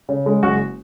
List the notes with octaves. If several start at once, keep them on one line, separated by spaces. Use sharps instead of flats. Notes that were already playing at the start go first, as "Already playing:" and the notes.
C#3
G#3
F#1 F#4